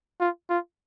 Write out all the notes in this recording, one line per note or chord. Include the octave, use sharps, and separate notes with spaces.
F4
F4